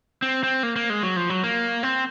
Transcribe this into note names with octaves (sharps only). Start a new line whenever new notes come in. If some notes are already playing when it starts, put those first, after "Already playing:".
C4
C4
A#3
A#3
G#3
F#3
F3
F#3
A#3
C4